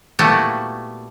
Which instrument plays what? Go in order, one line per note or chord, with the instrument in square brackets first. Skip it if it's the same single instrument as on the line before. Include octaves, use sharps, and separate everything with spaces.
[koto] A#2 G3 A3 B3 E4 F#4